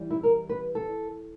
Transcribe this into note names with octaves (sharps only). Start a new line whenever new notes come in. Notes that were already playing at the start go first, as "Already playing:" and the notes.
Already playing: E3 G3
E4
A#4
B4
A4